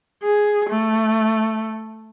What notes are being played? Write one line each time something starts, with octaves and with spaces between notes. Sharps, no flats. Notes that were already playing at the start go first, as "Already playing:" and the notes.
G#4
A3